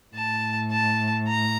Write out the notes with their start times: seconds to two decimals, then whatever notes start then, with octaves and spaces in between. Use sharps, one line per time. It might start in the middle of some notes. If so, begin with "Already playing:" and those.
0.15 A2 A5
0.71 A5
1.27 A#5